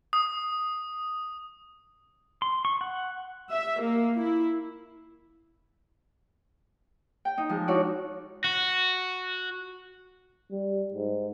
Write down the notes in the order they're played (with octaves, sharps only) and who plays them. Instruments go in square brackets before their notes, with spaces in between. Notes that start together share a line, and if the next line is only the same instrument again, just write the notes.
[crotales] D#6
[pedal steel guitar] C6
C#6
F#5
[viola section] E5
A#3
E4
[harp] G5
D#4
F3 G#3
D#4 E4 F#4 C#5 D5
[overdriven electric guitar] F#4
[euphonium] G3
G#2